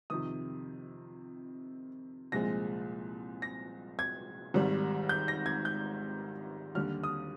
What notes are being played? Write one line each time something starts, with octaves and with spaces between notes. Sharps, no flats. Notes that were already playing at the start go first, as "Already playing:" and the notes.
F2 C3 D#3 D#6
C2 A#2 F3 G#3 A#6
A#6
G#6
G#1 G#2 D#3 G3
G6
A#6
G#6
G6
D#2 D3 G3 F6
D#6